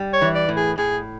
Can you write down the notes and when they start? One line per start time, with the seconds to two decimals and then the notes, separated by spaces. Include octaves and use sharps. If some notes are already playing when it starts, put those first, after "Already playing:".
Already playing: G3
0.13 C#5
0.21 E3
0.35 D5
0.49 A2
0.56 G#4
0.78 A2 G#4